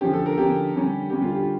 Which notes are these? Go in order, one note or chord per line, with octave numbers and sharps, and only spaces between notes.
D3 F3 C#4 G4
A4
A#4
D3 F3 C#4 G4
D3 G3 C#4
D3 G3 C#4 G4
F4
G4